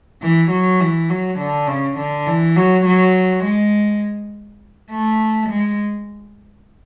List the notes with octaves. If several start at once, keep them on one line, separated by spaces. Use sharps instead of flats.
E3
F#3
E3
F#3
D3
C#3
D3
E3
F#3
F#3
G#3
A3
G#3